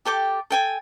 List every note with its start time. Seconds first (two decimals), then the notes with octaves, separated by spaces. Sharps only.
0.05 G4 A4 G5 D6
0.50 A4 G5 G#5